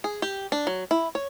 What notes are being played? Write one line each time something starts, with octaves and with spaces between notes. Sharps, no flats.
G#4
G4
D4
F#3
E4
C#5